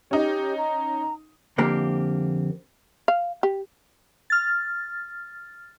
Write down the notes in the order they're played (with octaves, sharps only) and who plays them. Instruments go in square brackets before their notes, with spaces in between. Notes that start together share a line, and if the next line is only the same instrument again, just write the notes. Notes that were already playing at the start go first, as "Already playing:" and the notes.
[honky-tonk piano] C#4 D#4 [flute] G4
[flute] A#5
[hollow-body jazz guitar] F2 D3 A#3 C4 G4 A#5
[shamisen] F5
G4
[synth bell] F6 A6